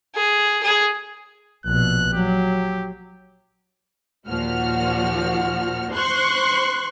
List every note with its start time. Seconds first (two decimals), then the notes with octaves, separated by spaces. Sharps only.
0.15 G#4
0.63 G#4
1.65 A#1 B2 F#6
2.14 F#3 G4
4.28 D#2 A#2 F3 F#4 F6
5.91 C5 C6 C#6 F#6